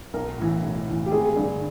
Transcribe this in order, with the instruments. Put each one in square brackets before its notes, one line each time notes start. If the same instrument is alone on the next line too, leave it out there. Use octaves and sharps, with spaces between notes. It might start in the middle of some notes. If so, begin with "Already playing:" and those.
[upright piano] B1 A#4
A2 E3
B1
A2 E3
G4
G#1 G#4
G2 D3